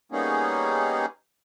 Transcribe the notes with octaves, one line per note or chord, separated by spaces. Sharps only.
G3 A#3 B3 C#4 D#4 G#4